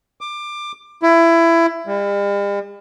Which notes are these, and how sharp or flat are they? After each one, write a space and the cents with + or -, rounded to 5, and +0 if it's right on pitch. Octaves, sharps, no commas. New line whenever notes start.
D6 +20
E4 +20
G3 +45